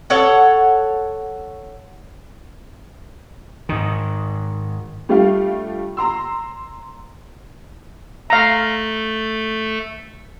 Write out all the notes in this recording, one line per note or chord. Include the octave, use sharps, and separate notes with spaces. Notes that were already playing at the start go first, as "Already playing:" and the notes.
A4 C#5 F#5
G#2 D#3
G3 A3 D4 F4 G4 F5
A#5 C6 E6
A3 A4 F5 A#5